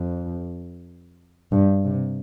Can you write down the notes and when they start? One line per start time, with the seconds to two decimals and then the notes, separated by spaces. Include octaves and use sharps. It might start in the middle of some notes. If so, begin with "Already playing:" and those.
Already playing: F2
1.52 G2
1.85 C3